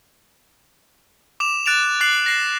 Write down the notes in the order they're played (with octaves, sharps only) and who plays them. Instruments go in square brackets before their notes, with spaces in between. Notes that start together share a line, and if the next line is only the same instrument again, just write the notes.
[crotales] D6 E7 F7
F#6 A6 D7 E7 F7
D6 F#6 A6 C7 F#7
A#6 C7 E7